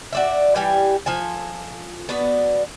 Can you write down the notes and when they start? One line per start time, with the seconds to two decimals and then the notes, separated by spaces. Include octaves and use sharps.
0.13 F#4 D5 E5
0.56 E3 G3 G4 G#5
1.06 F3 A4 G#5
2.09 B3 D4 F#4 B4